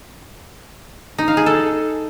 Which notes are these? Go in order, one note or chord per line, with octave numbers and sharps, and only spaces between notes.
D#4
F5
G#4
A4